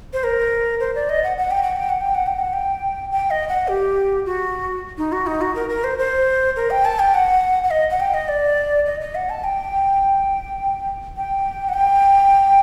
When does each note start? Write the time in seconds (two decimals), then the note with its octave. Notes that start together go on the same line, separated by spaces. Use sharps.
0.13 C5
0.24 A#4
0.80 C5
0.95 D5
1.09 D#5
1.24 F#5
1.38 F#5
1.51 G5
1.63 F#5
1.76 G5
1.89 F#5
2.01 G5
2.15 F#5
2.26 G5
2.39 F#5
2.53 G5
3.11 G5
3.31 D#5
3.49 F#5
3.68 G4
4.26 F#4
4.98 D#4
5.12 F#4
5.27 D#4
5.41 F#4
5.56 A#4
5.69 A#4
5.84 C5
5.99 C5
6.56 A#4
6.70 G5
6.85 A5
6.99 G5
7.14 F#5
7.64 F#5
7.71 D#5
7.90 F#5
8.00 G5
8.14 D#5
8.28 D5
8.86 D#5
9.01 D#5
9.15 F#5
9.30 A5
9.44 G5
11.17 G5
11.69 F#5
11.74 G5